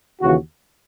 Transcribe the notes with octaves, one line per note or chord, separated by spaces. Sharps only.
D#2 C#3 E3 F#4